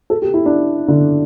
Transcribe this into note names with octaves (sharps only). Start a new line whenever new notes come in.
A4
G4
E4
D4
D3